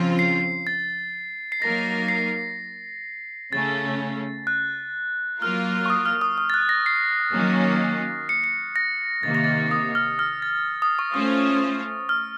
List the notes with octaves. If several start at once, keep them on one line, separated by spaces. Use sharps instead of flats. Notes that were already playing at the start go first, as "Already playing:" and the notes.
Already playing: C#3 F3 C4 F4
C7
A6
C7
F#3 A#3 D#4 A#4 A#6
C7
C#3 A3 C#4 A6
F#6
F#3 A#3 F4 A#4 F6
C#6
D#6
F6
D#6
D#6
A6
F#6
A#6
C7
D#3 F#3 A#3 C#4
C#7
C#7
A#6
C3 D#3 A#3 A6
A#6
A6
D#6
F6
F6
A6
D#6
C#6
A3 C#4 F4 C5 D#6
F6